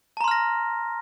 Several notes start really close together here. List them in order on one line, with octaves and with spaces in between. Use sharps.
A5 A#5 C6 F6 A#6